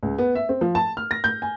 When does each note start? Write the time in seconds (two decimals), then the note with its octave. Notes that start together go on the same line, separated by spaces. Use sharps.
0.03 C#2
0.18 B3
0.35 E5
0.49 C4
0.61 F3
0.75 A5
0.97 F6
1.11 A#6
1.24 G6
1.42 G#5